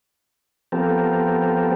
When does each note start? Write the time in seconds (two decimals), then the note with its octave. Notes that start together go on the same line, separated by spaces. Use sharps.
0.72 F3 B3 C4 G4 A4 A#4